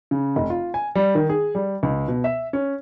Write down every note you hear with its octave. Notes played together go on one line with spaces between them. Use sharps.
C#3
F1
F4
G#5
G3
D#3
G#4
G3
C#2
B2
E5
C#4